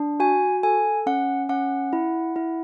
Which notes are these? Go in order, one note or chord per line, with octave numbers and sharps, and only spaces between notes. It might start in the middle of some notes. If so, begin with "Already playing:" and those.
Already playing: D4
F#4 G#5
A4 G#5
C#4 F#5
C#4 F#5
E4
E4